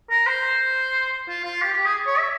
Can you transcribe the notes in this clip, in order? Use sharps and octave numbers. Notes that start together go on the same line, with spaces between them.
A#4
C5
F4
F4
G4
G4
G#4
C#5
E5